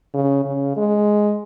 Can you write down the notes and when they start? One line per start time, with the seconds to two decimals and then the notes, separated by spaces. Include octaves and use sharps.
0.14 C#3
0.45 C#3
0.77 G#3